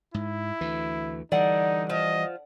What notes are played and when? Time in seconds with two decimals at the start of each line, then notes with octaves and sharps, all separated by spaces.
0.14 G#2 E4
0.61 D2 E3
1.32 D3 E3 G3 D#4 D5 F#5
1.90 F3 D#5